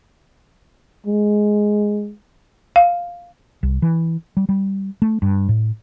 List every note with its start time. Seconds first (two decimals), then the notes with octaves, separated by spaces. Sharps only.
1.06 G#3
2.76 F5
3.63 C2
3.82 E3
4.37 G3
4.49 G3
5.02 A3
5.22 G2
5.49 A2